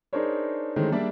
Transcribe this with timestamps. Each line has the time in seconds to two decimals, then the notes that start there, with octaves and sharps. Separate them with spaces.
0.13 D4 D#4 G#4 A#4 C5 C#5
0.76 D#3 E3 G#3 A3 C#4 C5
0.92 G3 A#3 D4 G#4 D5 E5